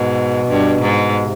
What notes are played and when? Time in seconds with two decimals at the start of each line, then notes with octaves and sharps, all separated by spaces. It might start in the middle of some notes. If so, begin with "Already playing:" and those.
Already playing: G#2 B2
0.48 G2
0.82 G#2
1.16 C3